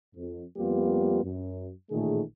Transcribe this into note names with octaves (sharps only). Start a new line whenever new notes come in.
F2
F2 G3 A#3 B3 F4 G4
F#2
A1 A#2 D#3 A3 G#4